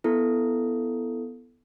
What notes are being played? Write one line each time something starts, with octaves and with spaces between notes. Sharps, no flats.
B3 E4 A4